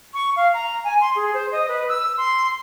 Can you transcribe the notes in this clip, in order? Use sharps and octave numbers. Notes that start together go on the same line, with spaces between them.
C#6
F5
A#5
G#5
C6
G#4
C5
D#5
B4
E6
C6